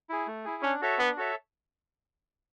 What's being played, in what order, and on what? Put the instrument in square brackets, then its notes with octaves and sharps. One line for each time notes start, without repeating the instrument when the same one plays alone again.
[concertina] E4 G#4
A3
E4 G#4
[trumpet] C#4 [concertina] D4
[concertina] F#4 A4 C#5 E5
[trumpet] B3 [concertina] D4
[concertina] F#4 A4 C#5 E5